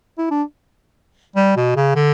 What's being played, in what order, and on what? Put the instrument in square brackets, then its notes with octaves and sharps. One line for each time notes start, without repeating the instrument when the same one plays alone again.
[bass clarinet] E4
D4
G3
B2
C#3
D3